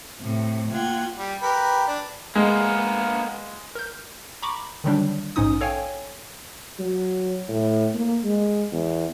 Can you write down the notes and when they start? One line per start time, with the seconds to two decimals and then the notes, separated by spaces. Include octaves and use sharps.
0.21 A2 C3
0.71 A#3 F4 F#5 G5 G#6
1.17 G3
1.42 G4 A#4 B4
1.88 D4
2.35 G#3 A#3 B3
3.75 A#4 G6
4.42 A#5 B5 C#6 D6
4.84 D3 D#3 F#3 G3 D4
5.36 A#1 G#2 C#4 D#4 D#6
5.61 A4 C#5 F5 G5 G#5
6.79 F#3
7.49 A2
7.94 A#3
8.24 G#3
8.72 E2